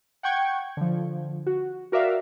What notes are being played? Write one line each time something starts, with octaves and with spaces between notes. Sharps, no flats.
F#5 G5 C#6 G#6
D3 F3
F#4
F#4 A#4 D5 E5 F5